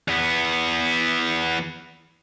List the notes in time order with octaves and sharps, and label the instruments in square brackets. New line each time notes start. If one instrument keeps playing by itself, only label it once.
[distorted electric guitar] E2 B3